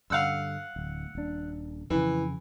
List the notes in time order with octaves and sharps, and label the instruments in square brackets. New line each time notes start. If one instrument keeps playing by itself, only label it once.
[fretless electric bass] G2 D3 [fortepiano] F5 F#5 E6
[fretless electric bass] D1
D#1 D4
[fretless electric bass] F2 C#3 [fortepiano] E3